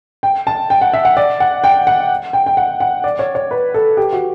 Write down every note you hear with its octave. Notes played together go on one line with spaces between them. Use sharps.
G5
A5
G5
F#5
E5
F#5
D5
F#5
G5
F#5
G5
G5
F#5
F#5
D5
C#5
C#5
B4
A4
G4
F#4